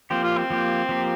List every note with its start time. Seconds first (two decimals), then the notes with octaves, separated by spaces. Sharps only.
0.10 F3 A#3 C4 G4
0.24 F4
0.37 C4
0.50 F3 A#3 G4
0.89 F3 A#3 G4